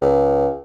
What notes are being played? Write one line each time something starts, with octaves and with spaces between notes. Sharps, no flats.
C#2